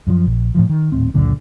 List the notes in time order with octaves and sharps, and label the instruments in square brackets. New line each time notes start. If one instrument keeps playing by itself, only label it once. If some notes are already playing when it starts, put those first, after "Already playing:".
[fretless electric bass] F#2 E3 F3
A#1
A2 E3 F3
D#3
D#1 A2 C4
C#2 F#2 A#2 D3